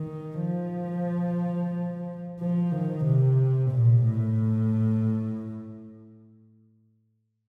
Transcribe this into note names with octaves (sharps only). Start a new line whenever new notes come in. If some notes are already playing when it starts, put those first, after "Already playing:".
Already playing: D#3
F3
F3
D#3
C3
A#2
A2